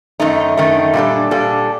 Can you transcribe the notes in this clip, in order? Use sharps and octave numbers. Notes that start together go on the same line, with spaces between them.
F#2 D#3 A3 D#4
F#2 D#3 A3 D#4
A#2 G3 D4 A4
A#2 G3 D4 A4